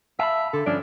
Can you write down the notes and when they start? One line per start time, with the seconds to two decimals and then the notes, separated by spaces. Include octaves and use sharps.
0.19 E5 F5 A5 B5
0.53 D3 A4
0.66 G2 F3 C#4 D4